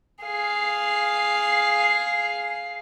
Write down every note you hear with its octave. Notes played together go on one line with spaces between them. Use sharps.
G#4 F5